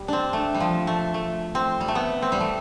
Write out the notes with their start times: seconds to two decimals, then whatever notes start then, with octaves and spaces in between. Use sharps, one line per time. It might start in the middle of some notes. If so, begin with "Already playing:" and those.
Already playing: G3
0.08 C4 D4
0.33 A3
0.55 G3
0.60 F3
0.87 A3
1.14 A3
1.55 C4
1.81 G3
1.88 A3
1.95 B3
2.22 C4
2.32 G3
2.41 A3